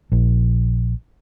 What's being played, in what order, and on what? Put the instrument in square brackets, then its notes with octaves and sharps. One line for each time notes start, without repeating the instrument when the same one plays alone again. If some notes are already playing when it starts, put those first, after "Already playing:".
[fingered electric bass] A#1